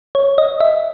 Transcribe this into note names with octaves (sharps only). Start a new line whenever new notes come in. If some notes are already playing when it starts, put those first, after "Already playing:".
C#5
D#5
E5